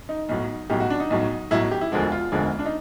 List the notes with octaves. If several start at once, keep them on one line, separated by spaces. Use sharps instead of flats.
D#4
B1 A2 F#3
B1 A2 F#3 G4
F#4
D4
D#4
B1 A2 F#3
B1 A2 F#3 E4
G4
E4
E1 D2 D3 F3 G#3 F#4
F4
E1 D2 D3 F3 G#3
D4
D#4